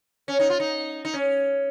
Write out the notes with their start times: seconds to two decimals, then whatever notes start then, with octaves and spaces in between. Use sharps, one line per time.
0.28 C#4
0.39 D#4
0.50 F4
0.60 D#4
1.05 D#4
1.14 C#4